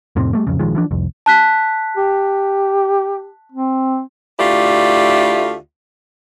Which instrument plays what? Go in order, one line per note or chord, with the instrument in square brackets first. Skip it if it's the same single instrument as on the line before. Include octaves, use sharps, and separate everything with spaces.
[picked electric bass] F2 A2 C3 C4
G3 A3 A#3
D1 F2 C#3
A#1 D#3 F3 G#3
E3 F3 D4
C2 F2
[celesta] A5 F#6 B6
[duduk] G4
C4
[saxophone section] D2 A3 E4 F4 G4 D5